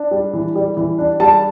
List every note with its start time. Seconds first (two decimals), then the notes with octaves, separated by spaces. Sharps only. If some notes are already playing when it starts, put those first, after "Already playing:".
Already playing: D4
0.11 G3
0.33 E3
0.55 G3
0.77 E3
0.98 D4
1.20 G3 A5